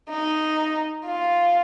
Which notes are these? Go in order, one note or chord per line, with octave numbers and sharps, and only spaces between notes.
D#4
F4